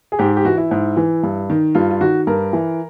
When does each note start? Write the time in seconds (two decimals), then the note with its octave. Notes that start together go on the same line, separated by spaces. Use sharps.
0.12 G#4
0.19 G#2 G4
0.37 G4
0.45 E3 F#4
0.57 E4
0.71 G#2
0.97 E3
1.23 G2
1.50 D#3
1.75 G2 F4
1.91 F4
2.00 D#3 F#4
2.27 G2 A#4
2.53 E3